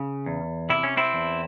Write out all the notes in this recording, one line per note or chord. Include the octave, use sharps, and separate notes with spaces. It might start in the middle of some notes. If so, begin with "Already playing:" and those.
Already playing: C#3
E2
C3 E4
C#4
C4 E4
E2